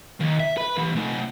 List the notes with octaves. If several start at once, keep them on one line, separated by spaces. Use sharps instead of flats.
D#2
E5
B4 B5
E3 C#4
A3 D#4